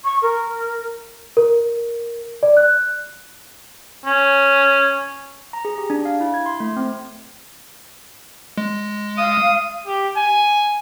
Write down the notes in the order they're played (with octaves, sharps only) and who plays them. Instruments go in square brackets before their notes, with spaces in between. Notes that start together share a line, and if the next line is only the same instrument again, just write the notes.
[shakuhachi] C#6
A#4
[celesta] A#4
D5
F#6
[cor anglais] C#4
[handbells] A#5
G#4
G4
D4
F5
E4
G#6
C6
A3
C4
[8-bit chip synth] G#3
[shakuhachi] F5 [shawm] D#6
[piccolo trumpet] G4
G#5